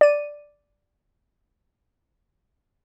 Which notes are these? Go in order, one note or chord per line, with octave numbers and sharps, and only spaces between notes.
D5 D#7